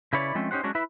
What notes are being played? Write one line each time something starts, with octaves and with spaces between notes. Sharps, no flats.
C#3 E4 B4 C#5 D5
F3 G#3 A3 C4 C#4
C#4 D#4 G4 C5 F#5
F#3 G#3 C#4 D4 F#4
E4 B4 E5